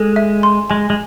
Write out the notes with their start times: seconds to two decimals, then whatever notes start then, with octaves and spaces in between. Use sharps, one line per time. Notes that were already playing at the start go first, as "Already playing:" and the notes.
Already playing: G#3 A4
0.16 E5
0.43 C6
0.70 G#3 G#5
0.90 G#3